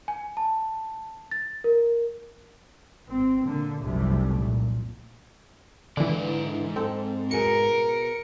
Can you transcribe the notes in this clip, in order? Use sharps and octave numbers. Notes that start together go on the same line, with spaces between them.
G#5
A5
A6
A#4
G#1 C4
A#2 D3 A#3
F1 C2 F#2 C3 G3 A3
A#2
G#2 D3 E3 D5
C4 A4
B2 F#4 G#4 A#4 C#7